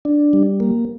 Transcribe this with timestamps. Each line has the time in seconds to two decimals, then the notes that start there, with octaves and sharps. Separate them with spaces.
0.05 D4
0.33 G3
0.60 A#3